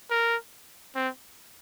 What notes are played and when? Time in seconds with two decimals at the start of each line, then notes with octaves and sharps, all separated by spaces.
0.10 A#4
0.95 C4